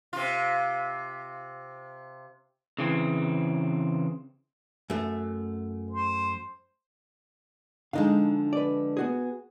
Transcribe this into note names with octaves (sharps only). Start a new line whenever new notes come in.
C3 F4
C#3 E3 C4
F#2 A3
C5
D3 F3 G#3 D#4 F5
B4 D5
B3 F#4 G#4